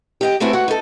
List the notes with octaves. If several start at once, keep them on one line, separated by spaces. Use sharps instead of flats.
G4 D#5 G5
A3 B3 C4 E4 F#4 G#5
F#4 C#5 F#5
D#4 A4